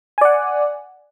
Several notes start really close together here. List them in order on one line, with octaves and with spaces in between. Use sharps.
G#5 D5 F#5